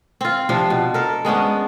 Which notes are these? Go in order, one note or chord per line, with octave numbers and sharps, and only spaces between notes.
C4 F4
C3 F3 D4
B2
A4 A#4
G#3 B3 C#4 D4